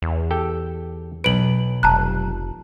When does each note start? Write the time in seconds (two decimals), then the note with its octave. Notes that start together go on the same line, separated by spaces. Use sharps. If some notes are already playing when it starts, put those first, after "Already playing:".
0.02 E2
0.31 G4 A4 G5
1.24 B1 B4 D7 F#7
1.83 F1 A5 A#5 F#6